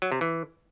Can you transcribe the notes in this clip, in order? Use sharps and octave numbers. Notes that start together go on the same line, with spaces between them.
F#3
C3
E3